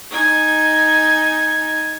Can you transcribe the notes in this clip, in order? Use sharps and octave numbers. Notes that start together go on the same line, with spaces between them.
D#4 G#5